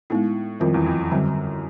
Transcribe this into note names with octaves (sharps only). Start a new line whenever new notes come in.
A2 G#3 B3 D#4
F2 D#3 G3 C4 F4 A#4
E2
F2
F#2 D3 G3 C4